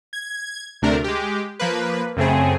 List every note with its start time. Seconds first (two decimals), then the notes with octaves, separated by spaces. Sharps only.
0.13 G#6
0.82 D2 C3 A3 D4 A#4
1.04 G#3 G4
1.59 F3 A#3 B4
2.17 F#2 C#3 A3 C4 G#4